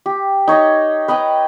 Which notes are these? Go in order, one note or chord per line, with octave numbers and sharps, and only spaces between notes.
G4
D#4 C#5 D#5 A#5
B4 D#5 G5 A#5